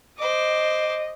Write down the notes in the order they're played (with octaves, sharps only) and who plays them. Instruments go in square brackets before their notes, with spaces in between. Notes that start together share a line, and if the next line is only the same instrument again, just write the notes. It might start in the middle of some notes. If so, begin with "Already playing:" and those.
[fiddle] C5 D6 [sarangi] D#5